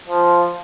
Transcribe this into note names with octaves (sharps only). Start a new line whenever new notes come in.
F3